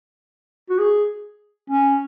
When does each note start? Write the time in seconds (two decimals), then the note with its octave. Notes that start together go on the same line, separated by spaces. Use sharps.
0.70 F#4
0.79 G#4
1.70 C#4